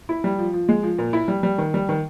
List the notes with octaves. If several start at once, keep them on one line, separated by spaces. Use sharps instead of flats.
E4
G3
F3
F3
G#3
F3
A#2
E4
G3
G3
D#3
G3
D#3